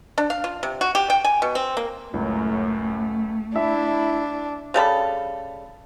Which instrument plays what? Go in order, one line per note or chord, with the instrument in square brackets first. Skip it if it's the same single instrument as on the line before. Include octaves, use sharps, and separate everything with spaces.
[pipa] D4
F5
F4
C3
F#4
G4
G5
G#5
B2
C4
A#3
[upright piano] C#2 [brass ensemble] F#2 A2 [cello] A3
[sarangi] D4 [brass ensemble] E4 [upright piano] E5
[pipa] C#3 G3 A4 B5